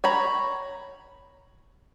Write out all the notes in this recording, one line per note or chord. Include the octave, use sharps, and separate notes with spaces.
C#5 A#5 B5